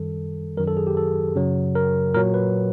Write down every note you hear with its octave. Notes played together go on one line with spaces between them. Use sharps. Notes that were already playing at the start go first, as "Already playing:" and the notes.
Already playing: F#2 D#3 G3 A4
F#2 D#3 F#3 A#4
A4
G#4
G4
A4
F#2 C#3 F#3
A#4
A#2 F#3 A#4
B4